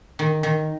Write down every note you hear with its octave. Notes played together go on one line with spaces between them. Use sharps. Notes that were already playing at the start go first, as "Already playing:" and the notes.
D#3
D#3